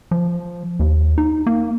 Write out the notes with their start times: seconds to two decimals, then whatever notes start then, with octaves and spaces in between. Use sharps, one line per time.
0.11 F3
0.79 D#2
1.18 D#4
1.46 A#3